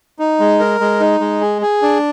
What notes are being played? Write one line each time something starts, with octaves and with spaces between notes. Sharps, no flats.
D#4
G#3
A#4
G#3
D#4
G#3
G#4
G#4
D4